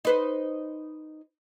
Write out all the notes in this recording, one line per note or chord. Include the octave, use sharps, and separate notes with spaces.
D#4 B4 C5